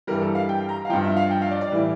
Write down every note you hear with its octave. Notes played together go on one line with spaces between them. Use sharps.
G2 E3 G3 A#4
A4
F5
G5
A#5
F5
G2 F3 G5
E5
F5
G5
F5
D5
D5
A2 E3 G3